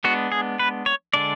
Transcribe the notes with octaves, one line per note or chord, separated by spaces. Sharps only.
G#3 B3 D4 F#4
G#4
B4
C#5
D3 G#3 D4 D5